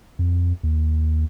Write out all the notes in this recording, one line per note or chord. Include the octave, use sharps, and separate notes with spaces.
F2
D#2